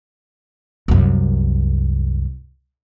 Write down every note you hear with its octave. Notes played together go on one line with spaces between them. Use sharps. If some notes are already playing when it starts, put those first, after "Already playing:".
C2 F#2